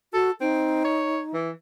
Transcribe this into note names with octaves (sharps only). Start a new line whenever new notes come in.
F#4 A4
C4 D#4
C#5
E3